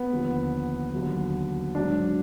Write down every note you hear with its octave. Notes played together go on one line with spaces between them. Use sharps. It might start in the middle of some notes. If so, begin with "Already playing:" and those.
Already playing: B3
D#2 D3 F3
D#2 D3 F#3
G#2 F#3 D4